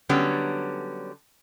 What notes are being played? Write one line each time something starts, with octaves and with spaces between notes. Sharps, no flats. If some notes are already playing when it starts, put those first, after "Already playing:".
D3 F#3 G3 B3 C#4